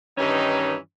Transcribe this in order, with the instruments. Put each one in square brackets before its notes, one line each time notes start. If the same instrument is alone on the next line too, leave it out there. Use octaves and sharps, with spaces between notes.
[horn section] G2 D#3 E3 C#4 D#4